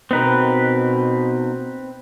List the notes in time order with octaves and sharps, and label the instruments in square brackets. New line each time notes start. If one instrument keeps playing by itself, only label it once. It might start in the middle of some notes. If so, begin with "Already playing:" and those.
[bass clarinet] B2 [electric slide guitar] B3 D#4 A#4 [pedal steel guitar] C4 B4